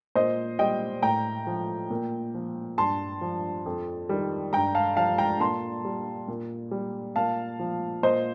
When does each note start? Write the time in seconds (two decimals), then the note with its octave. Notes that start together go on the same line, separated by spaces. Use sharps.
0.15 A#2 C5 D#5
0.59 G3 D#5 G5
1.02 A2 G5 A#5
1.47 F3
1.90 A#2
2.34 F3
2.78 G2 A5 C6
3.21 F3
3.66 F2
4.09 D#3 G3
4.53 G2 G5 A#5
4.75 F5 A5
4.97 F3 F5 A5
5.18 G5 A#5
5.40 A#2 A5 C6
5.85 G3
6.28 A#2
6.71 G3
7.16 A#2 F5 A5
7.59 F3
8.03 A#2 C5 D#5